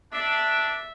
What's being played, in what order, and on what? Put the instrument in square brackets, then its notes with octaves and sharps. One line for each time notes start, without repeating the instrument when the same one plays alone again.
[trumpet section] D4 [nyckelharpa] E5